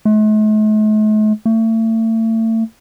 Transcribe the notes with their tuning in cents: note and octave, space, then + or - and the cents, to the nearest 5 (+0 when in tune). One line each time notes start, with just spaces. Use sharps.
A3 -45
A3 +35